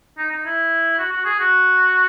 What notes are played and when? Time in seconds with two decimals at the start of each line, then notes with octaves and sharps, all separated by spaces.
0.18 D#4
0.31 D#4
0.46 E4
0.99 F#4
1.12 F#4
1.25 G#4
1.39 F#4